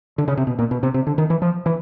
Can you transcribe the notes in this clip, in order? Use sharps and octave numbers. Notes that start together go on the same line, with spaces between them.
D3
C#3
C3
B2
A#2
B2
C3
C3
D3
D#3
E3
F3
E3